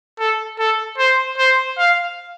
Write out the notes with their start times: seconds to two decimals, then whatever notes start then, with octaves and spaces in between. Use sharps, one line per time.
0.19 A4
0.59 A4
0.98 C5
1.38 C5
1.78 F5